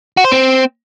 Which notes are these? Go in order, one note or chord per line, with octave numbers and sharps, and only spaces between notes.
F#4
C5
C4